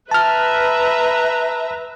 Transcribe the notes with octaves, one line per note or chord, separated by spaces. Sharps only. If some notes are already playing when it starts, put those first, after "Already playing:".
B4 E5 A5 A#5 F6